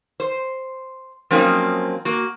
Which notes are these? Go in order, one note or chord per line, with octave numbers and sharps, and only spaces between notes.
C5
F3 F#3 A#3 C4 C#4 D#4
A#3 F#4